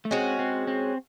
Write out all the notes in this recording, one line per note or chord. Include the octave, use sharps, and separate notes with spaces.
A3
G#3 C4 C#4 F#4
C4
C4